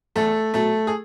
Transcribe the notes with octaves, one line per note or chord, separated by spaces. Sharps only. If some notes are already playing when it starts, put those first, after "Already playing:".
E2 A3 A4
B2 F#3 A3 A4
G#4